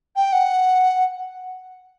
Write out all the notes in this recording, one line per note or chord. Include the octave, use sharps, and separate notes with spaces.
G5
F#5